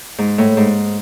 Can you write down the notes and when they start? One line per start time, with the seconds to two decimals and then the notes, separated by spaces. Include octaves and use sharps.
0.18 G#2
0.38 A2
0.57 G#2